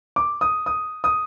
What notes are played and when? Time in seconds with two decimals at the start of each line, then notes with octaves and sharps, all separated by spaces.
0.16 D6
0.41 D#6
0.66 D#6
1.04 D#6